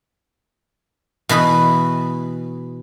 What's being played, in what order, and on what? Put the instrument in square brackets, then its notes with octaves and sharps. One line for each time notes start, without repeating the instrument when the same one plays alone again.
[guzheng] B2 E3 B4 B5